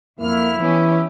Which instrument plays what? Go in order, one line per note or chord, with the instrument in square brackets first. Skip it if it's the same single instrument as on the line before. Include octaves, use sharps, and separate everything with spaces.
[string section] F2 F6 [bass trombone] A#3 [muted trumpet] E4
[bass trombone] E3 [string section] B3 C#4 G4